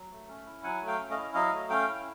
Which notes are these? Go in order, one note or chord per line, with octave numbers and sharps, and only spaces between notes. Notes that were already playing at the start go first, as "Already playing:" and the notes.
Already playing: F#3
A3
C#4
E4
F#3 F#5 G#5
A3
F5 G5
C#4
D#5 F5
E4
F#3 D#5 F5
A3
C#4 F5 G5
E4